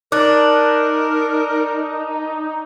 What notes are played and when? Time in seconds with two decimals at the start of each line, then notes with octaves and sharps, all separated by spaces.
0.12 D4 D#4 A#4 D6 F#6 A6